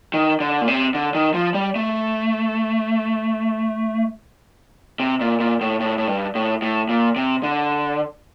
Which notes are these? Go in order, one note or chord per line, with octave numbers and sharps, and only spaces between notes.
D#3
D3
A#2
C3
D3
D#3
F3
G3
A3
C3
A#2
A#2
A2
A2
A2
G2
A2
A2
A#2
C3
D3